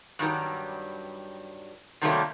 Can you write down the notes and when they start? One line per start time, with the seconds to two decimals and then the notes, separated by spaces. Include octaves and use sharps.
0.19 G2 D#3 F#3 G3
2.01 C3 D#3 F#3 G3 A3 A#3